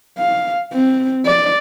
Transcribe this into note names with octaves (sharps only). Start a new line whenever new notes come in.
F5
C4
D5